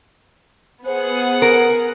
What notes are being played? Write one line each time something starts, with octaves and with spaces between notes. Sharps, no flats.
B3 G#4 C5 F#5
A#4